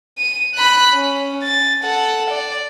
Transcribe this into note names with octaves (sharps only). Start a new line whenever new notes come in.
D#7
B5 F#6
C#4
A6
A4 F#5
D5